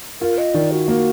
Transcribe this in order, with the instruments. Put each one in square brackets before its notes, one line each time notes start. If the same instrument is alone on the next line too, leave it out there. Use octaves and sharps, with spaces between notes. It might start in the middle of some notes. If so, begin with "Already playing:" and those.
[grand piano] F4 [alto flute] A#4
[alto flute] D#5
[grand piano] D#3 [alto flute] D5
[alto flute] F#4
[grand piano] A#3